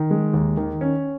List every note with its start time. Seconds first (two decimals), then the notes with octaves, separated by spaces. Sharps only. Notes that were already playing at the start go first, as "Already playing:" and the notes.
Already playing: D#3
0.11 G#3
0.33 D#2
0.57 D#3
0.81 C#4